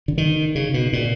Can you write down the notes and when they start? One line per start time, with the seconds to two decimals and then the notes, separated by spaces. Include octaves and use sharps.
0.08 D3
0.18 D#3
0.55 C#3
0.74 B2
0.93 A#2